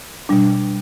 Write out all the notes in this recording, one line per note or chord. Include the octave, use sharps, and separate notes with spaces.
B2 G3 D4